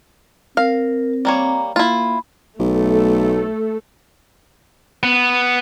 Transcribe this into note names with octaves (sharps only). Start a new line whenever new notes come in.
C4 A#4 F5
G3 A#3 C#5 A#5
A#3 E4 F4 B5
B1 A3 A4
B3